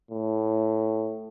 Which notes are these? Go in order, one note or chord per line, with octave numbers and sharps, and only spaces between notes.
A2